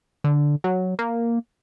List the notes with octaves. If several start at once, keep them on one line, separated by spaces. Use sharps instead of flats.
D3
F#3
A#3